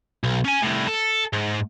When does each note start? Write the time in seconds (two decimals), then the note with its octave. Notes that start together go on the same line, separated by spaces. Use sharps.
0.24 B1
0.45 C#4 G#5
0.62 C2 A2
0.87 A4
1.33 G#2